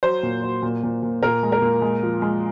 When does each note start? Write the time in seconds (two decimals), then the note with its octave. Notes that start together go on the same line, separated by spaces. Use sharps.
0.03 F#3 C5
0.23 A#2
0.43 F#3
0.63 A#2
0.83 A#2
1.03 A#2
1.23 A#2 A#4
1.43 G#3
1.52 A#4
1.62 A#2
1.82 G#3
2.03 F3
2.22 G#3